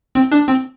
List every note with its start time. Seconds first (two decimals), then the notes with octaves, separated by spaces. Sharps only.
0.15 C4
0.32 D4
0.47 C4